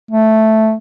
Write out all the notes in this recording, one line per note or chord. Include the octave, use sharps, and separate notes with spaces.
A3